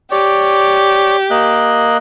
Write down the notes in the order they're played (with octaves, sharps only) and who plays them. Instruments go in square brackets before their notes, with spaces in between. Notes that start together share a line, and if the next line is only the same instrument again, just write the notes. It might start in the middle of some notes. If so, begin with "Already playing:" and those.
[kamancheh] G4 [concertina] C#5 D5
[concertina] A#3 D#5 F#6